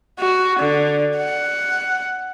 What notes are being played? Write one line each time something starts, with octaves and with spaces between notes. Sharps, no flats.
F#4
D3
F#5